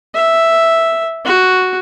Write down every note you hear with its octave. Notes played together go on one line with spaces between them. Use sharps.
E5
F#4